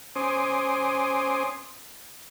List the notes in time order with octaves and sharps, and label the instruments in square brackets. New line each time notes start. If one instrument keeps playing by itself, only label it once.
[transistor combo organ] C#4 C5 G#5 C6 D6 D#6